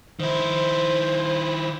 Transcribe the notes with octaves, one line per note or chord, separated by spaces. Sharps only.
D#3 E4 C5